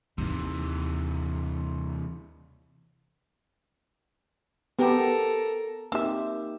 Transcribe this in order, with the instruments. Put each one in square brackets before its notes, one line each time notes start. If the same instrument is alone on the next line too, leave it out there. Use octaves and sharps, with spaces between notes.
[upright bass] D#2 D#4 [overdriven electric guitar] C3 E3
[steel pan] B3 G4 [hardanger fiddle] A4 A#4
[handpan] A#3 D#4 G4 [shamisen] C4 E5